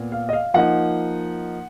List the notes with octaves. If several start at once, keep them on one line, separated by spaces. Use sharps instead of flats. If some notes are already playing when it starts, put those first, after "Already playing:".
Already playing: A#2 B3
F5
D#5
F5
F3 A#3 D#4 F#5